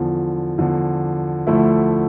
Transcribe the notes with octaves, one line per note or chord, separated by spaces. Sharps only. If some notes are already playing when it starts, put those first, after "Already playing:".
Already playing: E2 D3 F3
E2 D3 F3
D2 D3 F3 A3 E4